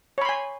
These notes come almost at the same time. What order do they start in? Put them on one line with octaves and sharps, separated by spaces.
C#5 B5 C6 G#5